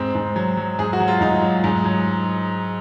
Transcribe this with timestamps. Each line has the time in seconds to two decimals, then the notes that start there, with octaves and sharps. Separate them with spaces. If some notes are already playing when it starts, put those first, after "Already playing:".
Already playing: G#2 C4
0.15 G#2
0.36 F#3
0.57 F#3
0.79 G#2 G#4
0.93 F#4
1.00 F#3
1.08 F4
1.21 G#2 D#4
1.42 F#3
1.64 G#2
1.85 F#3